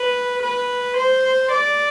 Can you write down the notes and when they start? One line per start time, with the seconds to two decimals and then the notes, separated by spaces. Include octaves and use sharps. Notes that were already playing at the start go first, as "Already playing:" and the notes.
Already playing: B4
0.43 B4
0.97 C5
1.52 D5